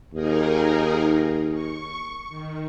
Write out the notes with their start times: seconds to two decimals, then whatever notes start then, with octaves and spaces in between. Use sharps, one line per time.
0.14 D#2 D#4 G#4 A#4
1.53 C#6
2.29 D#3